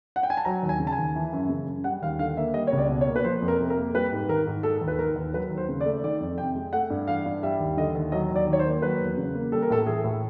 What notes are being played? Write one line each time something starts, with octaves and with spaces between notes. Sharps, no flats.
F#5
G5
G#5
A5
F#3 A#5
D#2
G#5
C#3
A5
G#5
D#2
E3
F#2
C#3
F#2
G3 F#5
D#2 F5
D3 F5
A#3 E5
G3 D#5
C#5
C#2
D5
B2
C#5
A#3
B4
F3 C5
F2
A#4
C3
A#4
A#3
G3 B4
G#2
D#3 A#4
G#2
G#3 A4
D#2
B4
D#3 A#4
D#2
F#3 B4
D#2
C5
C#3
D5
A3
D#3 D5
F2
C3 G5
G#3
A3 F#5
G2
E3 F5
G2
G3 E5
D#2
D3 D#5
D#2
F#3 D#5
D#2 D5
D#3
C#5
C5
A#3
F#3 B4
E2
C#3
A#3
G3 A4
A#4
A2 A4
E3 G#4
A2